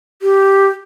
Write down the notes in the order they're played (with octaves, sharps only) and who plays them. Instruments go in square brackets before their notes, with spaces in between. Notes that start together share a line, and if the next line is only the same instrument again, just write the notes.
[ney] G4